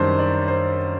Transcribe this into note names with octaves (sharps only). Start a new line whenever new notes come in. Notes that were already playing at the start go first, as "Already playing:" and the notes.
Already playing: F#2 D#3 G3 D4 C5
D5
C5